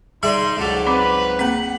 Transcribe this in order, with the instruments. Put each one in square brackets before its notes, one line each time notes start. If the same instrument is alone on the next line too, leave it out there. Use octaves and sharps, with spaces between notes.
[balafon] G3 [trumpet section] D#4 C6 [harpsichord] G#4 D5 E5
[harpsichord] C#2 G#2 F#3 [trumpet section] D4 A4 D5
[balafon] C4 B5 D6 [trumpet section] B4
[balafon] A#3 C4 [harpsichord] F#5